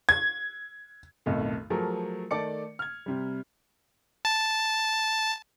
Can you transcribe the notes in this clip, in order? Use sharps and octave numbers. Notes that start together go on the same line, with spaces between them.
G#6
B1 F2 A2 D#3 A3
F3 F#3 A3 G#4 A#4
D#3 A3 A4 D5 D6 C#7
F6 G#6
C3 G3
A5